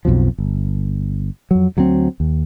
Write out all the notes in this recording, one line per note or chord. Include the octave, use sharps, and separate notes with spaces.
B1 F2 B2 F3
G1
F2 F#3
D2 F#3 G3 C4
D#2